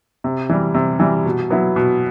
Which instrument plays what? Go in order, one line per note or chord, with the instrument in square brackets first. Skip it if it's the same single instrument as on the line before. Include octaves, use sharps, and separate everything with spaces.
[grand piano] C3
E3 G3
C3
E3 G3
B2
F#3 B3 E4
B2